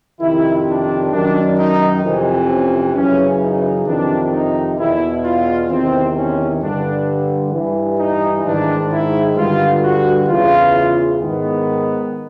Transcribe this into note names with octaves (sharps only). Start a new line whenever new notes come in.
F2 C3 D#3 E4
D4
F#2 D#3 D4
D#4
F2 C3 E3
C#4
F#2 C#3 E3 C#4
D#4
F2 C3 D#3 D4
D#4
E2 B2 E4
F4
E2 C3 D#3 C4
C#4
G2 D3 D4
G2 E3
D#4
G#2 D#3 D4
E4
G2 D3 F4
F#4
E2 C#3 E3 F4
G#2 D#3 B3